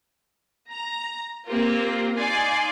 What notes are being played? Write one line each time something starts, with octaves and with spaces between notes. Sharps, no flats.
A#5
A#3 C4 F4 G4 A#4
D#4 D5 F5 G#5 C6